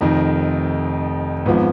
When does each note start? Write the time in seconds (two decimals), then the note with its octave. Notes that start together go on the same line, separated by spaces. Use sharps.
0.01 F1 F2 D#3 D#4
1.46 G#1 G#2 F3 B3